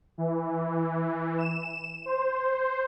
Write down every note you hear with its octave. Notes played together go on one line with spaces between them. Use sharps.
E3
E7
C5